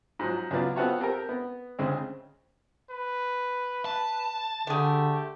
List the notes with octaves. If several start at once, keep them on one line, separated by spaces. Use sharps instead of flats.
G#2 F3 F#3
C#2 F#3 B3 F4 D5
B3 C4 F4 F#4 A4 C#5
C4 G4 A4 A#4
B3
D2 C#3 G#3 C4
B4
A5
D3 A3 G4 G#4